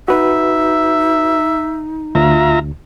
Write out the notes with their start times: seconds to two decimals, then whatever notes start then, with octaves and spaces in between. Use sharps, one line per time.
0.08 D#4 F#4 B4 E5
2.15 D2 F4 E5 A#5